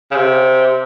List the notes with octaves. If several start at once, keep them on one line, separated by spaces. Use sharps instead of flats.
C#3
C3